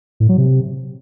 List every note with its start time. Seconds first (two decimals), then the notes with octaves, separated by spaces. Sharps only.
0.20 A2
0.29 F#3
0.38 C3